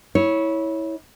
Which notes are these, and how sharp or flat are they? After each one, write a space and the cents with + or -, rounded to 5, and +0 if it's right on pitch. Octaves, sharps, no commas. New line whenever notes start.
E4 -20 C#5 +0